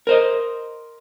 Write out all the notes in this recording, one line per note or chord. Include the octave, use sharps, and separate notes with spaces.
A#4 C5 D#5